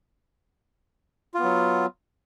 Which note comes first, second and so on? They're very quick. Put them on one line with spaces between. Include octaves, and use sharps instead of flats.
F4 B3 F#3